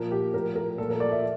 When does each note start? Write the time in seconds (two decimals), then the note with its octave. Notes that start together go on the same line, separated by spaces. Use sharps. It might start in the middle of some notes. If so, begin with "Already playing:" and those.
Already playing: A#2 F3 A#4
0.11 G4
0.33 A2 F3 A#4
0.55 A#4
0.78 A#2 F3 A4
0.90 A#4
1.00 D5
1.12 E5